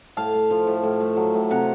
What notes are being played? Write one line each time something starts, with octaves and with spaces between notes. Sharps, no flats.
A2 F5 A5
A3
F3
A2
A2
A3
F#3
A2
C3 F#5 A#5